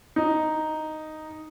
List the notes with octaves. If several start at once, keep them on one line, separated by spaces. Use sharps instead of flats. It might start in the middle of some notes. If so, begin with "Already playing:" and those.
D#4